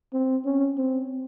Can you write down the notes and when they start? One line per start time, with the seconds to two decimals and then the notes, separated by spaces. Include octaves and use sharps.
0.13 C4
0.46 C#4
0.78 C4